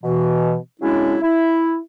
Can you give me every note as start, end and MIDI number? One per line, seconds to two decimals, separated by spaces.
0.03 0.55 47
0.03 0.55 52
0.81 1.17 49
0.81 1.17 54
0.81 1.17 56
0.81 1.17 61
0.81 1.17 62
0.81 1.17 64
1.22 1.78 64